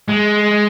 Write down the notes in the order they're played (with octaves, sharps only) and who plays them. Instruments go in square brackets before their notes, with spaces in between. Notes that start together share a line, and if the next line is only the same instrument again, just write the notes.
[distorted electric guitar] G#3